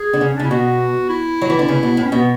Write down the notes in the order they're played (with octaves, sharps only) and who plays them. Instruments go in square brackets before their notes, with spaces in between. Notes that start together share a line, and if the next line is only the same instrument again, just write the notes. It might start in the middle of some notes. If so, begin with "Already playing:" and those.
Already playing: [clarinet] G#4
[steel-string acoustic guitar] D3
C#3
[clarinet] C#4
D4
[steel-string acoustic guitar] C#3 [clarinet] E4
[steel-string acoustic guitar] B2 [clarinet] F#4
[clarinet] E4
[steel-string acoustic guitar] F#3
E3
D3
C#3
B2
A2
[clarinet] C#4
[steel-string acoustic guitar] B2 [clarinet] B3